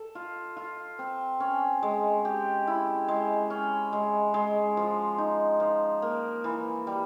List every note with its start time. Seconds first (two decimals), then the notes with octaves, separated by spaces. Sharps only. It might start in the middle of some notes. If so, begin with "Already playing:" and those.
Already playing: A4
0.15 F4
0.57 F4
0.99 C4
1.40 C#4
1.83 G#3
2.25 G4
2.67 E4
3.08 G#3
3.50 C#4
3.93 G#3
4.34 G#3
4.77 F3
5.18 D#4
5.60 F3
6.02 A#3
6.44 E3
6.87 G3